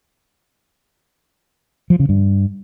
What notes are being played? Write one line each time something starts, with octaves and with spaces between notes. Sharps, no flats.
F3
C#3
G2